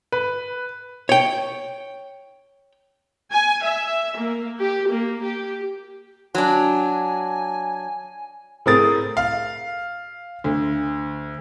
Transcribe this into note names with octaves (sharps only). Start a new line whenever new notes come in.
B4
C#5 G5
G#5
E5
A#3
G4
A#3
G4
F#3 D4 G#5
A2 C4 G#4 A#4 D#6 A6
F5
D2